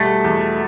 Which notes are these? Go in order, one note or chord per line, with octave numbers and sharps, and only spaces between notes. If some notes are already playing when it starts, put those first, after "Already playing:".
Already playing: E2 B2 G3 A3
E2